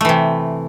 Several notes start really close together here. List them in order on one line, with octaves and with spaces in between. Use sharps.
A3 E3 C3